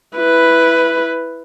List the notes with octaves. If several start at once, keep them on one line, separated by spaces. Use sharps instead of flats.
E4 B4